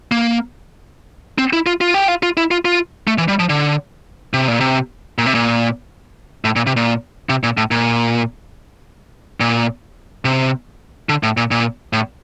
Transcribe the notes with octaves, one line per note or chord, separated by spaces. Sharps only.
A#3
C4
E4
F4
F4
G4
F4
F4
E4
F4
F4
A3
E3
G3
F3
D3
C3
A#2
C3
A#2
C3
A#2
A2
A#2
C3
A#2
C3
A#2
A2
A#2
A#2
C3
D3
A2
A#2
A#2
A2